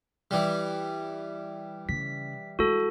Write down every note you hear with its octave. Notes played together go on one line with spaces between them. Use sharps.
E3 G3
C#3 B6
G#3 E4 F#4 A4